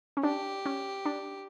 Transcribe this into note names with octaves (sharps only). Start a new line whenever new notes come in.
C#4
D4 G4
C#4
D4